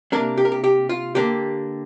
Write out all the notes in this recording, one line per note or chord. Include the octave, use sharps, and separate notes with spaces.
C3 A#3 D4 A#4
G4
A#4
G4
G4
F4
D3 A#3 D4 G4